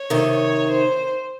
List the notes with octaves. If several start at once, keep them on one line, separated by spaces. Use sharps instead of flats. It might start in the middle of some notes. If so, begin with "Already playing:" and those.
Already playing: C#5
C3 D#3
C#5
C5